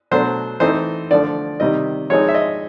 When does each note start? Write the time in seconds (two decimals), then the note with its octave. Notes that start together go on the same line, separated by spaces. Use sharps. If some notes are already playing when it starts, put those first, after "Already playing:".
0.11 B2 F#3 A3 D4 C5
0.60 E3 A3 C4 D#4 C5
1.11 D3 F3 A3 D5
1.60 C3 D#3 G3 D#5
2.10 F3 G#3 C4 D#4 C#5
2.29 E5
2.34 D#5